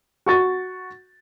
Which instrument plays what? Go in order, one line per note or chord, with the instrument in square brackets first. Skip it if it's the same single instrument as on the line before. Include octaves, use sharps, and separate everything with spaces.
[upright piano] F#4 C#6 A6